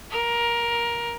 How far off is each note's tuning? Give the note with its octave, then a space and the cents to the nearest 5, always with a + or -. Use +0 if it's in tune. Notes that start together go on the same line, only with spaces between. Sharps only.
A#4 +15